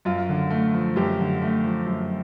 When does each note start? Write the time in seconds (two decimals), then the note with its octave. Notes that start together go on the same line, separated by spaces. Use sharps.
0.05 F#2 F4
0.29 D3
0.50 A3
0.74 F3
0.96 F#2 G4
1.19 D3
1.42 A3
1.64 F3
1.86 F#2